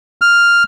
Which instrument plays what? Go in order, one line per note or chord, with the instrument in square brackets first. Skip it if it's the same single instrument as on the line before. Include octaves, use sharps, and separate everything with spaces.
[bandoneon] F6